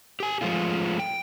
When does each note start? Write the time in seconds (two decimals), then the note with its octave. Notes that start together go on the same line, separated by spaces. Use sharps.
0.20 G4 G#5
0.41 F3 G#3 A3 F4
0.99 G5